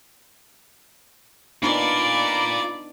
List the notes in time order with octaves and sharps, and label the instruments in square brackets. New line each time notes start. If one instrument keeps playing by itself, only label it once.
[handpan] B3 D4 D#4 [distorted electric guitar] F4 A#4 [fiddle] D5 D6 [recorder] B5